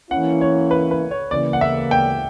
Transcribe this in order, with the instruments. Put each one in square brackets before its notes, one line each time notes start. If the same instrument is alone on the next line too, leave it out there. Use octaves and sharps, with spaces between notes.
[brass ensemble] E3 A#3 C#4 E4 [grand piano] F#5
[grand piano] C#5
B4
B4
C#5
[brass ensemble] C#3 E3 A#3 [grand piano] D5
[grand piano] F#5
E5
G5